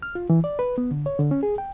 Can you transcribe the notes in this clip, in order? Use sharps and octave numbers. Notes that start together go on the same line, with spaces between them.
F6
F4
E3
D5
B4
B3
D3
C#5
D3
C#4
G#4
G5